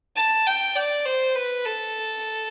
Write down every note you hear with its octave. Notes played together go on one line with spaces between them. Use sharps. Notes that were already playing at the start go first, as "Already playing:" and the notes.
A5
G5
D5
C5
B4
A4